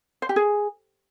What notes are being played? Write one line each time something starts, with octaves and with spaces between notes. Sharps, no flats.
C5
G4
G#4